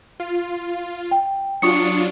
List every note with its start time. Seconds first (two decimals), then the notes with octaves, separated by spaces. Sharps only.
0.20 F4
1.11 G5
1.62 F#3 D4 F4 C#6 D#6 C#7